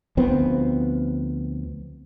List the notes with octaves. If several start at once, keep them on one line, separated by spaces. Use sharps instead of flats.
D2 F3 B3 C4